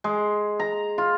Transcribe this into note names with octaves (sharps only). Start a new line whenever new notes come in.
G#3
A#5
F4